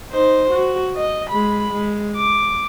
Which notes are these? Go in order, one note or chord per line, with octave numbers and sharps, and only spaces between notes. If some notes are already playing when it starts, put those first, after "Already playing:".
D#4 C5
F#4
D#5
G#3 B5
G#3
D6